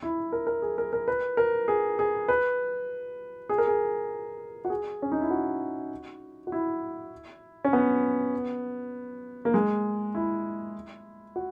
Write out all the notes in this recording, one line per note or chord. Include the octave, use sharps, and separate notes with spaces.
E4
A#4
A#4
G#4
A#4
A#4
B4
A#4
G#4
G#4
B4
G#4
A#4
G#4
F#4
G#4
C#4
D#4
E4
F#4
F#4
E4
C#4
B3
A#3
G#3
E4
F#4